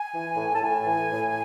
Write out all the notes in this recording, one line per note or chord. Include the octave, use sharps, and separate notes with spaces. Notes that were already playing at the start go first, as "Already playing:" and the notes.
Already playing: G#5
E3
A2
A5
A2 G#5
E3
A2